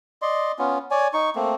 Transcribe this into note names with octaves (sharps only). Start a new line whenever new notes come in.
D5 D#5 C6
B3 C#4 F4
C#5 D5 G#5
D#4 C#6
A3 A#3 C4